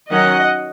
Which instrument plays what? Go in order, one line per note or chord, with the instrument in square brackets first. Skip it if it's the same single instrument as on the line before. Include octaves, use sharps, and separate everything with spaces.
[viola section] D#3 F#3 C#4 D#5 F#5